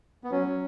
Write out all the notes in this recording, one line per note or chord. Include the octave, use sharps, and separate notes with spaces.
B3
F#3 C#4
F#3